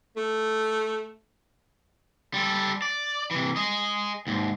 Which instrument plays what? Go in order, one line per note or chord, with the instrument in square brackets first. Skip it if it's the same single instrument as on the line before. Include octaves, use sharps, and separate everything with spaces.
[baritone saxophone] A3
[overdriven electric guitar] G3 A4
D5
C3 E3
G#4 D#5
D#2 G#2